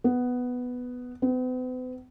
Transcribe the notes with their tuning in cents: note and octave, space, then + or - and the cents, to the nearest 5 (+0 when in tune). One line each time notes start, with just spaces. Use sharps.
B3 +5
B3 +45